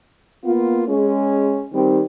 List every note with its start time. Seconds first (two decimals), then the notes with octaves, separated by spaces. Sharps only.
0.44 A#3 B3 F4
0.87 G#3 C#4
1.73 D#3 G3 C4